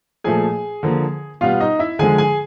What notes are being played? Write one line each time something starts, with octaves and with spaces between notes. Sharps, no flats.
A#2 F3 A3 G#4 G#5
D3 F3 A#3
B2 G3 B3 F4 F5
D#4 D#5
E4 E5
D3 F3 G#3 G#4 G#5
G#4 G#5